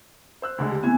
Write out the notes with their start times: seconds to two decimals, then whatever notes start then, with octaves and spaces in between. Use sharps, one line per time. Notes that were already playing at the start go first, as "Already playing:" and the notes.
0.42 C5 E6 F#6
0.58 D2 D3 G#3
0.72 G4
0.83 A2 E3 B3 C4 G#5 G#6